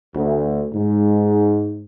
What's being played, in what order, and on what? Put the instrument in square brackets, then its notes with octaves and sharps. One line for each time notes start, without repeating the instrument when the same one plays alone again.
[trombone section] D2
G#2